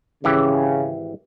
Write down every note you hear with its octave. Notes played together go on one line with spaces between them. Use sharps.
G#1 C#3 E3 G4